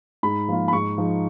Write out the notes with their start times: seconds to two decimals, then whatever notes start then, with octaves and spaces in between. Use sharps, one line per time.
0.23 G#2 B5
0.48 F3 A#3 F4
0.68 B5
0.72 G#2 C#6
0.98 F3 G#3 D#4